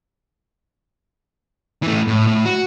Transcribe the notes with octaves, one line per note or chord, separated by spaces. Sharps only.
E3 A3
A2
A2
F#4